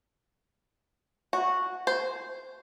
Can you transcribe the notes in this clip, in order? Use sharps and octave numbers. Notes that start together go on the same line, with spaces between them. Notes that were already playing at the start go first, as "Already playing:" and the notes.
F#4
C5